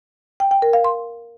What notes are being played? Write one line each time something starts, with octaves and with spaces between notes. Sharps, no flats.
G5
G5
A#4
F5
C6